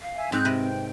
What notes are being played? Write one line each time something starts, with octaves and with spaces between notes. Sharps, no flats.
F5
E5 G#5
G#2 C4 F#6 G6
C3 A#4 B4
G5